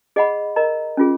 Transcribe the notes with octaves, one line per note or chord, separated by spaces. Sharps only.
G#4 D#5 F#5 B5
A#4 D#5 A#5
C#4 F4 G#4